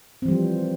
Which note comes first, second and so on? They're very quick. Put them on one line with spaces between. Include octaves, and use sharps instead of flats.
C4 E3 G3 F3